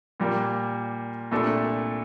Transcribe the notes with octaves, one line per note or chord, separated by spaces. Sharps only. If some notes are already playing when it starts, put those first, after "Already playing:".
A#2 G3 A#3
C2 A#2 A3 D4 A4